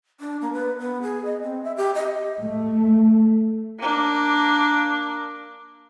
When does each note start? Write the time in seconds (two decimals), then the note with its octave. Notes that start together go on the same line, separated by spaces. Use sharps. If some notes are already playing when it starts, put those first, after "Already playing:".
0.20 D4
0.41 A#3
0.53 B4
0.79 B3
1.02 G#4
1.25 D#5
1.42 C4
1.64 E5
1.77 G4
1.95 D#5
2.42 A3
3.79 A#3 D4